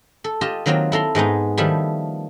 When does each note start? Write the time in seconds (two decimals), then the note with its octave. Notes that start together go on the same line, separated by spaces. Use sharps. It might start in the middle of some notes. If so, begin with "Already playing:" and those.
0.24 A4
0.41 F4 G4 D#5 A5
0.66 D#3 F#3 A#3 C4 F4
0.92 E4 A4 A#5 C6
1.15 G#2 G#3 B3 D#4
1.57 D#3 F3 G3 A3 E4